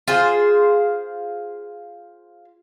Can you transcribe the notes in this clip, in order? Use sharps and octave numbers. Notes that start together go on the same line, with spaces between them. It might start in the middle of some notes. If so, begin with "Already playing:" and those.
F4 G#4 C5